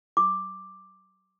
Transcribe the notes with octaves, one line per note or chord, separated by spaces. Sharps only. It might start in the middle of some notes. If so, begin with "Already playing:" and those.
D6